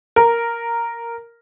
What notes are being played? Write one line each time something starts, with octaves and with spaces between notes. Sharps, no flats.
A#4